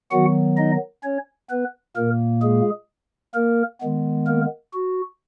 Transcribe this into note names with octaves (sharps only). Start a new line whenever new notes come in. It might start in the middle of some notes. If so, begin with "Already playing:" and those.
D#3 F#3 B3 F#4 F#5
D#4 D#5
C#4 C#5
B3 B4
A#2 A#3 A#4
G#3 G#4
A#3 A#4
D#3 G#3 B3
A#3 A#4
F#4